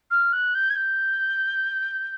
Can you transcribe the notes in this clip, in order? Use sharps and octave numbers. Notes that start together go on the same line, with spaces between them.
F6
F#6
G6
G#6
G6